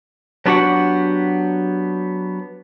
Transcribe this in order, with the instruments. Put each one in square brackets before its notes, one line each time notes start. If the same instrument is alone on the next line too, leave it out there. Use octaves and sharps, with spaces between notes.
[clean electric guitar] F#3 B3 D4 F#4 G4 F#5